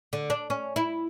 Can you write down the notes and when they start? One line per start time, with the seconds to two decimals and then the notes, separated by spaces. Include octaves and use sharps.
0.13 D3
0.30 D4
0.50 C#4
0.76 E4